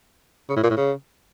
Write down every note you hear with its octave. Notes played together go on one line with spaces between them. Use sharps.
C#3
A2
A#2
A2
C#3